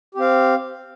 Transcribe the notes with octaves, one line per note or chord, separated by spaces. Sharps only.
C4 G4 F5